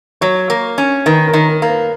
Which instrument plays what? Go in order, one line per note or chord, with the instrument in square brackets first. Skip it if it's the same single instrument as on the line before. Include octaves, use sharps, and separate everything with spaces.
[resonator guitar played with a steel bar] F#3 [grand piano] C#5
[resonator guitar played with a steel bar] A#3
C#4
[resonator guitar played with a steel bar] D#3 [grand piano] B4
[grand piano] A#4
[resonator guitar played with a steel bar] D#3
[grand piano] A#4
[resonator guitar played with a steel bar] A#3
[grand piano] B4